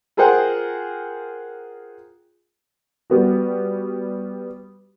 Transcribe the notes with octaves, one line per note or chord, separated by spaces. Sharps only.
F4 G#4 A#4 C5 F#5 G5
G3 B3 F#4